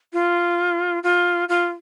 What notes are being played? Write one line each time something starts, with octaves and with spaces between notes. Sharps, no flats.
F4
F4
F4